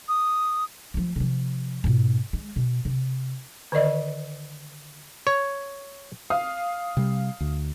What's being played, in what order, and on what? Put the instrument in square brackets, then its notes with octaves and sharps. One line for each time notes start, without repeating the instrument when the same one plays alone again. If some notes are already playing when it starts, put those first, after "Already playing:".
[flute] D#6
[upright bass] F3 A3
C3 F3
G#2 B2
G#3
B2
C3
[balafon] D3 D#3 A#4 D5 D#5
[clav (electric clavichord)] C#5
[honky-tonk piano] F5 D#6
[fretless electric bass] C3 G3
D2